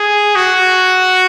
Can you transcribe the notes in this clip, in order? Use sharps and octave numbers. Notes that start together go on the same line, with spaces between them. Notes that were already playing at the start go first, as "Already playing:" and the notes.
Already playing: G#4
F#4